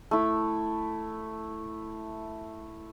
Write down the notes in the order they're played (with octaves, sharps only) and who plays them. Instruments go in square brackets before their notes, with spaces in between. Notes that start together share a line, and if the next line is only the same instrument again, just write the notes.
[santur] A3 E4